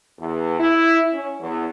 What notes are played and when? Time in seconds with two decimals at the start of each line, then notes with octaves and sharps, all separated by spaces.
0.19 E2
0.60 E4
1.11 C#4
1.40 E2